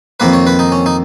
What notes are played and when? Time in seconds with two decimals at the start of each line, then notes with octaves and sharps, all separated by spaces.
0.20 F2 D#3 A#3 B4
0.33 C#5
0.47 B4
0.59 D#4
0.72 C#4
0.86 D#4